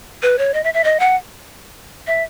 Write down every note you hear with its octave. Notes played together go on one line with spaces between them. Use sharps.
B4
C#5
D#5
E5
E5
D#5
F#5
E5